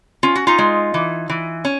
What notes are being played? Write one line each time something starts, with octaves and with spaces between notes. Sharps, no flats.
C#4 F4
F#4
D#4 F4
G#3
E3
E3
C#4